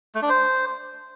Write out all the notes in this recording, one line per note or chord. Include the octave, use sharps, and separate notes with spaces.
A3
D4
C5